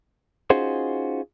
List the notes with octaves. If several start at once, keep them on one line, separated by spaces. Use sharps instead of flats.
C#4 D#4 F4 F#4 G#4 C5